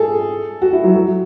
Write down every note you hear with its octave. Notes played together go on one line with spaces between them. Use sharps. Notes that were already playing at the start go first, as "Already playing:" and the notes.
Already playing: G#4 A4
F#4
E4
F#3
F#3